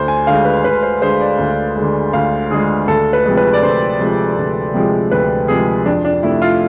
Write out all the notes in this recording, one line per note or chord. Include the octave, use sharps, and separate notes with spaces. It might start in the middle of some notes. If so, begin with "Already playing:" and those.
Already playing: D2 C5
G#5
D3 G#3 F5
B4
D2 B4
C5
D3 G#3 C5
D5
D2
D3 G#3
D2 F5
D3 G#3 G#4
D2 A4
B4
C3 F3 G#3
B4
D5
D2 C5
C3 F3 G#3
D2
C3 F3 G#3
D2 B4
C3 F3 G#3 G#4
F2 D4
D4
C3 F3 A3 E4
F4